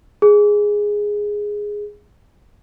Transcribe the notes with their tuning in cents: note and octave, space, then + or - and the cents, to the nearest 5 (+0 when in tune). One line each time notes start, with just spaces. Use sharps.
G#4 -5